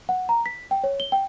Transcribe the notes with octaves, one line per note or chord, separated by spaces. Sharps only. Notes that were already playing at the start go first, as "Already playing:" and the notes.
F#5
A#5
B6
G5
C#5
G7
G5